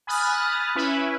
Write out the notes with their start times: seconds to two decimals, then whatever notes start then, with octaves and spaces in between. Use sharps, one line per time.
0.07 G#5 B5 D#6 F6 F#6 A6
0.75 C#4 E4 B4